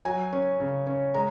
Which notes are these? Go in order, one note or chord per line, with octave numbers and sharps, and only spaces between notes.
F#3 G#5
C#4
C#3
C#4
G#3 A#5